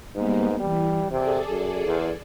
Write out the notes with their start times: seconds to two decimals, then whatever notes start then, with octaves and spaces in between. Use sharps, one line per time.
0.15 G#2 G3 A#3 B3
0.60 E3 G3
1.10 C3 G#4 A4 D5
1.50 F#2
1.86 E2